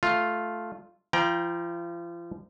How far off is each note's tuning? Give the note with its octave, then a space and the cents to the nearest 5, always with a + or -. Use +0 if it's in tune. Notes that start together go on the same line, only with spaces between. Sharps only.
A3 -5 F4 +0
F3 -35 G5 +0 A#5 +30